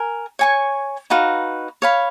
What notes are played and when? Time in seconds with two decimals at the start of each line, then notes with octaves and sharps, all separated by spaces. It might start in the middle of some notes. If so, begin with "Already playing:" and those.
Already playing: A#4 G#5
0.39 C#5 G#5 C#6
1.10 D#4 F#4 B4 F5
1.82 C#5 F5 B5